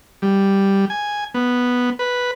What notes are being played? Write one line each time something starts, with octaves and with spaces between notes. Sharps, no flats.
G3
G#5
B3
B4